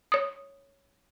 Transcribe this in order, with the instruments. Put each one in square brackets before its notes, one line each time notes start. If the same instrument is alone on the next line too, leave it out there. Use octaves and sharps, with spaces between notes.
[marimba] C#5 D#6